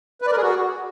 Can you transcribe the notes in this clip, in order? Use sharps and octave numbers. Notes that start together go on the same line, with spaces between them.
B4
D5
A#4
G#4
F#4